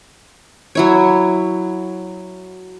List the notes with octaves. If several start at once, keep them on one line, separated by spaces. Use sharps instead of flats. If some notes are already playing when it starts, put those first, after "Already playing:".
F#3 E4 C#5